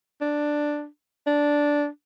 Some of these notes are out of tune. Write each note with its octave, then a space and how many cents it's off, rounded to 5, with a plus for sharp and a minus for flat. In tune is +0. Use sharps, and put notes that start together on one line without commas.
D4 +5
D4 -5